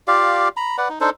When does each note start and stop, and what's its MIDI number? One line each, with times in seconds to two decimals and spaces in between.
0.08 0.49 65
0.08 0.49 67
0.08 0.49 74
0.08 0.49 77
0.57 0.77 82
0.57 0.77 83
0.78 0.88 71
0.78 0.88 74
0.78 0.88 78
0.89 0.99 63
1.01 1.10 62
1.01 1.10 63
1.01 1.10 69
1.01 1.10 72